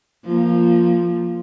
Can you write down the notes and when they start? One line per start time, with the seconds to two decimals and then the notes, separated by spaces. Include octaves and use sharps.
0.24 F3 A#3